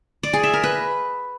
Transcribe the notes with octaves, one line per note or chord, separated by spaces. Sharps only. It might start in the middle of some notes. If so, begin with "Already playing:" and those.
D5
G#4
E5
A#4
B4